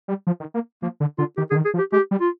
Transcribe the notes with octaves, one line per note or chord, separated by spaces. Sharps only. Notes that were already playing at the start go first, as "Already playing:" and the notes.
G3
F3
D#3
A#3
F3 A#3
D3
D3 F4
D#3 G4
D3 G#4
D#3
G#4
F3
G4
G#3 G4
G3
F4